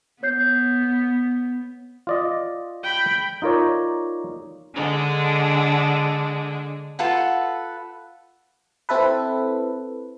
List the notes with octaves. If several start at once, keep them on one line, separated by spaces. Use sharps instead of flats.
B3 C#5 G6 C7
F4 D5 D#5
G5 B5
D#4 F4 A#4 C#5 D5
D3 G#3 D4
F4 A4 B4 F#5
C4 E4 A4 B4